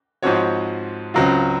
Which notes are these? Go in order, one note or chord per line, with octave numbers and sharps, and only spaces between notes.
G#2 F3 C4 F#4 C#5
C#2 C#3 F#3 C4 F4